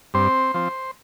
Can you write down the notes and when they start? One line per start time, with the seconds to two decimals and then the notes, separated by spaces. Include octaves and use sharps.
0.14 G2 C4 C5
0.54 F3 C4